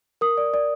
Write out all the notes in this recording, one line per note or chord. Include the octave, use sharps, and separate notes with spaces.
A#4 D#6
D5
D5